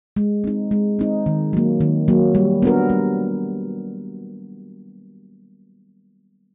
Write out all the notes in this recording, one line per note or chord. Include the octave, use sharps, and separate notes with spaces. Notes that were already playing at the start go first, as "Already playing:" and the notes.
G#3
C4 D#4
G#3
C4 D#4
D#3
F#3 A#3
D#3
F#3 A#3
G3
B3 D4 F#4 A#4
G3